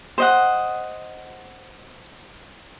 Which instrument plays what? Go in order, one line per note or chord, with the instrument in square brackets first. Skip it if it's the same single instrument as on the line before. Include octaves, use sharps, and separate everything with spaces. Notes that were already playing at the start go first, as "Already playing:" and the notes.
[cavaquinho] C5 D#5 F#5